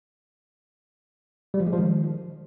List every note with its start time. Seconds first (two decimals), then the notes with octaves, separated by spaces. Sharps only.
1.54 G3
1.60 F3
1.66 G#3
1.73 F3
1.79 D#3